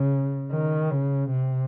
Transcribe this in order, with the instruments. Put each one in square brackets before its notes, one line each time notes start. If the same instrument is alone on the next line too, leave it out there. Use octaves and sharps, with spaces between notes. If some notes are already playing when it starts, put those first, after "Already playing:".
Already playing: [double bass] C#3
D#3
C#3
C3